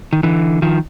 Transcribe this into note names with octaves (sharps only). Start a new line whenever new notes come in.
D#3
D3 E3
D#3 F3